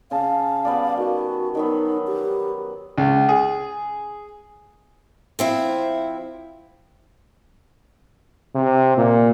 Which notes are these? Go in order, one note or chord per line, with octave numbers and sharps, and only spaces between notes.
C#3 G#4 F5 A5
G3 B3 D5
D#3 F#4
D#3 F#3 B3 D#4
G4
C#2
G#4
F3 C4 E4
C3
A#2